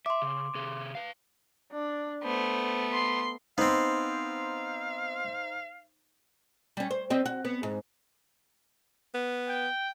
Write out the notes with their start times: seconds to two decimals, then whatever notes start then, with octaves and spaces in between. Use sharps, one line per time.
0.06 E5 C6 D6
0.22 C#3
0.55 C3 G#4
0.95 B4 F5
1.72 D4
2.23 A3 B3 C5
2.93 C6
3.58 B3 C4 D#4 C5 F5
6.77 G3 C#4
6.91 C5
7.10 G3 C4 D#5
7.26 F#4
7.45 B3
7.63 G#2
9.14 B3
9.49 G5